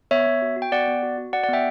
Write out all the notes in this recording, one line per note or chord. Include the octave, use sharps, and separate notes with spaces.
B3 C#5 E5
B3
F#4
F#4
G5
B3 D5 F#5
B3
F#4
F#4
F#4 D5 F#5
D5 F#5
B3 E5 G5